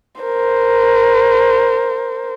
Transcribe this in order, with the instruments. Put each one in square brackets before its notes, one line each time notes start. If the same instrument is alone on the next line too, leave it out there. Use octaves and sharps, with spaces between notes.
[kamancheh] A#4 C5